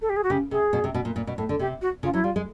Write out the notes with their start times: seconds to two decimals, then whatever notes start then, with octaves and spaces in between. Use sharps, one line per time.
0.01 A4
0.09 G4
0.16 G#4
0.23 F#4
0.30 C#3 G4
0.51 C3 G#4
0.73 B2
0.84 C3
0.94 B2
1.05 A#2
1.16 A#2
1.27 B2
1.38 A2
1.49 D3
1.59 C3 G4
1.81 F#4
2.03 C#3 F4
2.13 F#3 E4
2.24 G3 F4
2.36 G#3